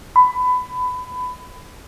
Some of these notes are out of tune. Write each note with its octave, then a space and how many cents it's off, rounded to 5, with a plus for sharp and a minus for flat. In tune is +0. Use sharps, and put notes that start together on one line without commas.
B5 +20